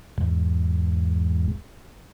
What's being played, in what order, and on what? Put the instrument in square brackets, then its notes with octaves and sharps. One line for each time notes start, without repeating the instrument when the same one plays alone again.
[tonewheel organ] E2 G#2